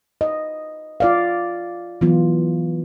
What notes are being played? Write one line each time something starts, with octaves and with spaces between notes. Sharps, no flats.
D#5
F4 D5 F5
E3 F#3 B3 F4